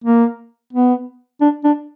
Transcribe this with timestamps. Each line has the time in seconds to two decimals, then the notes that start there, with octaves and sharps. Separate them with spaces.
0.04 A#3
0.73 B3
1.41 D4
1.64 D4